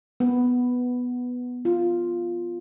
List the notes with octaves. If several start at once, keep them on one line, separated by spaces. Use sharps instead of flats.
B3
F4